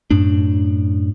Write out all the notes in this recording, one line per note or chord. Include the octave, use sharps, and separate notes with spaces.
F#2 A2 D4